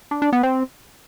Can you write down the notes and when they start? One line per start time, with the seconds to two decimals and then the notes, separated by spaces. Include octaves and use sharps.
0.11 D4
0.22 D4
0.33 B3
0.43 C4